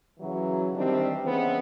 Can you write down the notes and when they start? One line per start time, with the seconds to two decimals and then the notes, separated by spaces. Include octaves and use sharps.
0.20 C#3 E3 F#3
0.74 D#3 E3 G3 C4 D4
1.23 C#3 E3 G#3 B3 C4